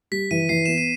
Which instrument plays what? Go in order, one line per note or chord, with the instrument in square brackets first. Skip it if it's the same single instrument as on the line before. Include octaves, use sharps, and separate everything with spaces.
[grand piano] G3 [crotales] B6
[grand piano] E3 [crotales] D#7
[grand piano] E3 [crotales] C7
[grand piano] B3 [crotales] E7
[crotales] D#7